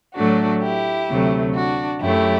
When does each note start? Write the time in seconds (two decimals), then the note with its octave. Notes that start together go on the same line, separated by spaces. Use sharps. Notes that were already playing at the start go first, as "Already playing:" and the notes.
0.16 A2 F#3 A3 D4 F#4
0.63 E4 G4
1.09 D2 C3 F#3 A3
1.56 D4 F#4
2.01 F#2 F#3 A3 E4 G4